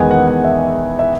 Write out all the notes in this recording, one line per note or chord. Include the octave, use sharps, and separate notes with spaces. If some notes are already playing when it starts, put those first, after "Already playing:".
Already playing: E2 D#3 G#3 B3 D#4 F#5 G#5
F#5
F#5
E5
E5